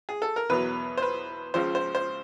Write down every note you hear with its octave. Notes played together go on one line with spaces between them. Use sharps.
G#4
A4
A#4
E2 B2 F#3 B4
C5
B4
C#2 C#3 F3 C5
C5
C5